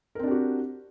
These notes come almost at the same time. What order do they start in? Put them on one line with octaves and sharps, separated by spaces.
A#4 C4 D4 G4 F#4